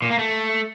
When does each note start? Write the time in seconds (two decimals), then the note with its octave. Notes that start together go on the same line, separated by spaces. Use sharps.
0.02 A#2
0.10 A#3
0.19 A3